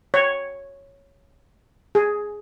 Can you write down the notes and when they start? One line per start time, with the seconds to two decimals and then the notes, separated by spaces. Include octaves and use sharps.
0.14 C#5
1.95 G#4